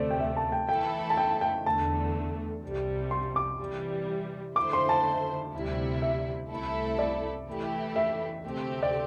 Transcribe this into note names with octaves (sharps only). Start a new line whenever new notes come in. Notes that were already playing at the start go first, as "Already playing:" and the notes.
Already playing: D2 C3 A3 C5 D5
G5
E5
A5
G5
E3 A3 E4 A4 G5
A5
G5
G5
E2 D3 A3 A5
C2 C3 G3
C6
D6
C3 E3 G3
D3 A3 E4 C5 D6
C6
A5
D2 C3 G3 E4
E5
C2 C3 A3 E4 A4
D5
E3 A3 E4 G4
E5
D2 C3 A3 C4 G4
D5